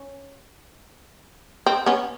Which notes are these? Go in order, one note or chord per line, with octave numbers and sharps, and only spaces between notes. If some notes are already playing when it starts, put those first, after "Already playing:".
Already playing: C#4
C4
B3 C#4